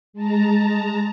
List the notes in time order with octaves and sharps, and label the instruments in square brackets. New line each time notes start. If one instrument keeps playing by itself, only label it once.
[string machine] G#3 A5 A#5